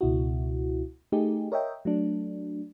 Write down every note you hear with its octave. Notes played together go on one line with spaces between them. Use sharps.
C#2 B2 E4 F#4
A3 D#4 G4 G#4
A#4 C#5 D#5 E5 G5
F#3 A3 D4